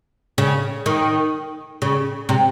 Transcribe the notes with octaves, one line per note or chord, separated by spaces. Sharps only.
C#3
D#3
C#3
C3